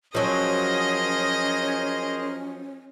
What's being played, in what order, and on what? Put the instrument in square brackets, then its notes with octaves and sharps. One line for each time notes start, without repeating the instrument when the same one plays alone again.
[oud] F3 F#3 [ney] C#4 [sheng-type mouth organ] G#4 A#4 C5 [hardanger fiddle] D#5